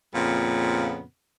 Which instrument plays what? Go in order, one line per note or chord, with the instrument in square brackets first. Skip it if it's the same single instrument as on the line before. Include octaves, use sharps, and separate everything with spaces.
[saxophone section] F2 A#2 C#3 B3